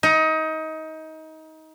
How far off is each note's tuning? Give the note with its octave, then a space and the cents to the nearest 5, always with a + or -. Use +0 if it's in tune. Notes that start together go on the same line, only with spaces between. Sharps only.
D#4 +25